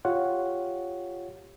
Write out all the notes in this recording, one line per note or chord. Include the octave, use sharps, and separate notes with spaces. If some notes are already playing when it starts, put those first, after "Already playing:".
F4 G4 C#5 F#5